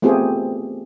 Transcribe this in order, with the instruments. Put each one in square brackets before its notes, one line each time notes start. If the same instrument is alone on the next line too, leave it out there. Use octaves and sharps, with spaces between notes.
[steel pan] A3 B3 C4 F4 G4 G#4